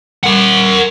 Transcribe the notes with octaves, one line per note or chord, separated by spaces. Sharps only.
A#4 F#5